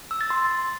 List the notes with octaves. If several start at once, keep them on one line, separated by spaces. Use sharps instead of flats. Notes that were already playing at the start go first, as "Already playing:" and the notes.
E6
A6
C6